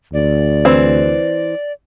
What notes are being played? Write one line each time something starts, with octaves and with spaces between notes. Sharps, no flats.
D2 D5
E3 C4